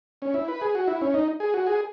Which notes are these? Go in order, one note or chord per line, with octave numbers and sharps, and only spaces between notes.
C#4
E4
B4
G#4
F#4
E4
C#4
D#4
G#4
F#4
G#4